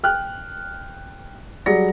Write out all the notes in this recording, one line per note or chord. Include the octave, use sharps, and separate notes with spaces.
G5 F6 F#6
F#3 G3 G#4 D5 A#6 C#7